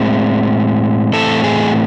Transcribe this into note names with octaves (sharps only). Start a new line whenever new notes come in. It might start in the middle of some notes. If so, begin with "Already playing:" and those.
Already playing: A2 G#3 C4 E4
A2 E3 A3 C4 A4
G#4